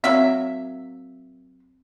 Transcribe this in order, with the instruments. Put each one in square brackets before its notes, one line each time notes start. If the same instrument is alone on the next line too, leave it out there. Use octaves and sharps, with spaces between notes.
[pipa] F#3 A#3 E5 [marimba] C4